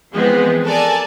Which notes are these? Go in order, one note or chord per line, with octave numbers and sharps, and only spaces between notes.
E3 F3 G#3 B3 C4
A4 A#4 D5 G#5 A5